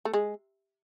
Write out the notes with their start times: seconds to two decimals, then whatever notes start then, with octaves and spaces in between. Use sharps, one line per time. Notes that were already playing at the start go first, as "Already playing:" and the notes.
0.05 A3
0.13 G#3